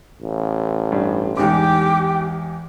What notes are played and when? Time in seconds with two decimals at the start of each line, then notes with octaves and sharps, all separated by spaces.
0.21 A1
0.92 G2
1.37 E2 G#2 G4 D6